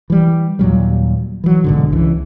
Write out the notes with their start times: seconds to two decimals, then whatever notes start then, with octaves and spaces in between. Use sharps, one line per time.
0.10 E3 G3
0.59 D#2 A#2 F#3 G3
1.44 E3 F#3
1.64 B1 G#2 D3
1.93 C#2 E3